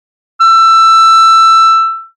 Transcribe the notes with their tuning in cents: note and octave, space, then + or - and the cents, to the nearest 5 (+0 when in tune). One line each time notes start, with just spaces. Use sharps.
E6 +15